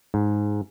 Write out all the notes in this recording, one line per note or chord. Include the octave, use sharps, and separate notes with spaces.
G#2